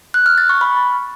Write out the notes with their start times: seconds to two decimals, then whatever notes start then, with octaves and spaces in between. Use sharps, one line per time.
0.14 F#6
0.26 F6
0.38 A6
0.49 C#6
0.61 B5